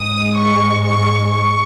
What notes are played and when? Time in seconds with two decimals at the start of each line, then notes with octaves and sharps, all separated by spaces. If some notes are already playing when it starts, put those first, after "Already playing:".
Already playing: G#2 G#3 D#6
0.38 C#6
0.85 C#6
1.32 C#6